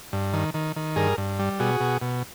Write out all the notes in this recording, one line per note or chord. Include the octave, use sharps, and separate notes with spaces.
G2
D#3
D#3
D#3
G2 G#4 A#4
G2
G3
B2 F#4 G#4
B2
B2